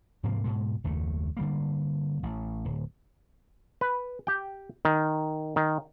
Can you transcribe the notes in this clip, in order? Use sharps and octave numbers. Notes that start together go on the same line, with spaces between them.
G#2 C3 F3 A#3
G#2 B2 G#3
F#1 D#2 A3
D3 G3 A#3
A1
D1
B4
G4 G5
D#3
D#3